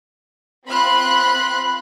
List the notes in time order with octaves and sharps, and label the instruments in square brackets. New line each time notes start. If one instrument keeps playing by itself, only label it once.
[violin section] C4 F4 B5 C6 F#6